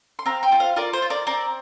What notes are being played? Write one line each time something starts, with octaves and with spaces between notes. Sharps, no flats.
C6
C4 F5 A#5
G5 C6
F4
C5 F5
F4 A#4 D5
C5
F4
A#4 D5
C4 A#4 D5